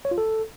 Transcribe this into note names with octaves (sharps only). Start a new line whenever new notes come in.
C#5
F4
A4